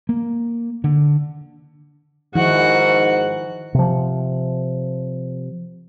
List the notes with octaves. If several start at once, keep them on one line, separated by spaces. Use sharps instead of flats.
A#3
D3
G#2 D#3 F3 E4 F#4 F#5
C3 F3